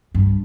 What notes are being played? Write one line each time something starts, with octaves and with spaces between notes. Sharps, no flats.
G2